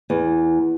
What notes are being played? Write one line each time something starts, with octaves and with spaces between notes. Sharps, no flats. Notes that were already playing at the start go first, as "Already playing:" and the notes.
E2